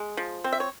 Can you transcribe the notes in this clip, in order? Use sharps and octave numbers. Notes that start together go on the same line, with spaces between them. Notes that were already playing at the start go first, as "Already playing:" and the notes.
Already playing: G#3
F3
C4
E5
C#5